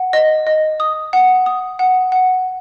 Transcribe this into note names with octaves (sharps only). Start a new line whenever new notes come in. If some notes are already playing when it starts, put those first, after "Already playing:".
Already playing: F#5
D#5
D#5
D#6
F#5
D#6
F#5
F#5